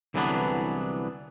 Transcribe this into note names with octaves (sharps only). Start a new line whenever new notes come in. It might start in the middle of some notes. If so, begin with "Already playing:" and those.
C2 D3 E3 F#3 B3 D4